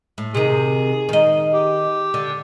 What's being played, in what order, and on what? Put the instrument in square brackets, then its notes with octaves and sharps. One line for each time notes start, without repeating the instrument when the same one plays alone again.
[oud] A2
[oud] C3 D#3 [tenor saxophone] G#4
[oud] D#3 D#5
[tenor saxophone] G4
[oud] D3